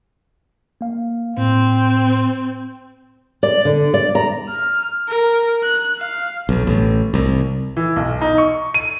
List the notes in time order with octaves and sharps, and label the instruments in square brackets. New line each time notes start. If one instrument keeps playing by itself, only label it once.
[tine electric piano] A#3 F5
[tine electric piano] A2 [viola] C4
[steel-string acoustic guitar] D5
D3
D5
A#5
[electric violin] F6
A#4
F#6
F5
[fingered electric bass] B1
A1
C2
[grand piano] E3
B1
D#4
C#6
D#7